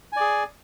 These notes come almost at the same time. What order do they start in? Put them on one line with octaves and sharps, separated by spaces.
G#5 D5 G#4